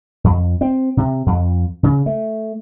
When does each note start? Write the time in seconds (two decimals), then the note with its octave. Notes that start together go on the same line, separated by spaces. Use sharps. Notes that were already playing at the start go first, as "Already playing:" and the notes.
0.24 F2
0.61 C4
0.97 C3
1.26 F2
1.83 C#3
2.06 A3